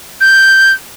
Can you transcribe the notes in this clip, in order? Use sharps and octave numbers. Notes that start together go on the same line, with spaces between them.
G6